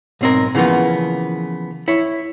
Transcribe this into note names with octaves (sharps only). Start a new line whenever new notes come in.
B1 G#2 C4 D#4 A#4
C#3 E3 F3 A#3 B3
E4 C#5